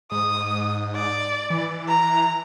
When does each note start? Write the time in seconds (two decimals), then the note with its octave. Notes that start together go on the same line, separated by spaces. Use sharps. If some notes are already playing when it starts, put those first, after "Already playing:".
0.11 G#2 D#6
0.95 D5
1.50 E3
1.88 A#5